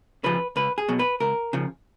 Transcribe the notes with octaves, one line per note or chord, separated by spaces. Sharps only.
C#3 F3 B4
C#2 B4
G#4
B2 F#3
B4
C#2 A#4
C#3 F3